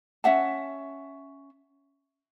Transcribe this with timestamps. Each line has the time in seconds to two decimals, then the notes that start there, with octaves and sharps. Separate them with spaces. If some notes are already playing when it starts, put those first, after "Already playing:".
0.24 C#4 E5 F#5 A5